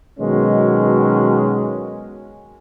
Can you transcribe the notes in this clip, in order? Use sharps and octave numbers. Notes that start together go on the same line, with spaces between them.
B2 D#3 F#3 G#3 C#4